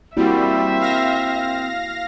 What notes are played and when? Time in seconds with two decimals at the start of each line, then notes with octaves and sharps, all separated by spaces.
0.17 G3 A#3 C4 E4 F#4 E5
0.81 F5 A#6